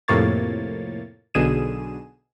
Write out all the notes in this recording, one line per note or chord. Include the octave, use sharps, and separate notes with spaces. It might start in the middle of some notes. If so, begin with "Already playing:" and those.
F2 A2 C3 A#3 C#5 A6
B1 B2 D3 G#4 D#7 E7